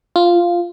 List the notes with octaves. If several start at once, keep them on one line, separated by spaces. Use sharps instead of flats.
F4